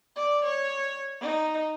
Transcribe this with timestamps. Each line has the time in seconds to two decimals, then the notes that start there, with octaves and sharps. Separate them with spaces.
0.16 D5
0.44 C#5
1.20 D#4